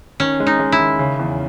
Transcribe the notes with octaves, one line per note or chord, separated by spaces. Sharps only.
D#3 C#4
G#3
D#4
G#3
E4
D#3
C#3
E2